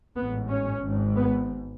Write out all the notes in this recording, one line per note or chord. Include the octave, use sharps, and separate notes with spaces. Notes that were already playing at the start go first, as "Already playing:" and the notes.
A1 G#2 B3
C#4
G#1 G#2
B3